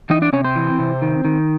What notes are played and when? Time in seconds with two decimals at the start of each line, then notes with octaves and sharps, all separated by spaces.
0.10 E3 D#4 D#5
0.22 D4 D5
0.33 C3 C#4 C#5
0.44 C4 C5
0.56 E3
0.79 C3
1.02 D#3
1.25 D#3